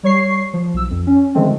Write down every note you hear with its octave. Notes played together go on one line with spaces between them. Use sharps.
G3 C#5 C#6 C7
F3
B1 E6
F2
C#4
D3 D#3 F3 G#3 A3 C4